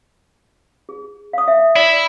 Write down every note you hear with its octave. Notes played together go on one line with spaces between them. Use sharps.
G#4
F5 D#6
E5
E4 D5